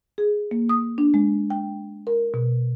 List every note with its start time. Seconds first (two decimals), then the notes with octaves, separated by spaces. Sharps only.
0.18 G#4
0.51 A#3
0.69 D#6
0.98 D4
1.14 G#3
1.50 G5
2.07 A#4
2.34 B2